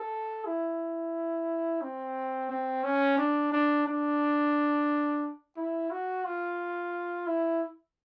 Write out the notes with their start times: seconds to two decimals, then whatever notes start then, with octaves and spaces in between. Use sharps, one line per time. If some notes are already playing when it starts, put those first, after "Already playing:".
Already playing: A4
0.45 E4
1.82 C4
2.50 C4
2.84 C#4
3.18 D4
3.52 D4
3.86 D4
5.57 E4
5.91 F#4
6.25 F4
7.27 E4